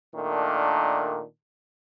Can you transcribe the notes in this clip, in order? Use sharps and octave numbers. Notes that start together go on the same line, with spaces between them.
A#2 D#3 A3 D4